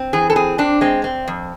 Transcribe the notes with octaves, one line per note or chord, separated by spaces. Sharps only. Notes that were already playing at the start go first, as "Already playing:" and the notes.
Already playing: C4
E3 G#4
A4
C4 G#4
C4 D4
G#3 C4
C4
F2